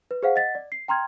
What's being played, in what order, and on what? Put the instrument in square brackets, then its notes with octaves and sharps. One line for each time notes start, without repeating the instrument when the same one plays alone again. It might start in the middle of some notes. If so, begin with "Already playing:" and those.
[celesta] B4
G#4 C5 F5 F#5
D#5 F#5 A6 B6
D5
C7
G5 A#5 C6 F6 G#6